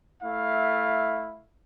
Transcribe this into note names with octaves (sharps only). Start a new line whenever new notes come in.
A3 E4 F5